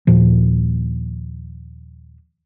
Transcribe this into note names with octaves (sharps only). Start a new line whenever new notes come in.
D#2 A#2 F3